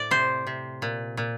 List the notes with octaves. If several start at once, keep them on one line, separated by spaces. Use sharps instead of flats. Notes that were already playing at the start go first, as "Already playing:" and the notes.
Already playing: A2 D5
C3 C5
C3
A#2
A#2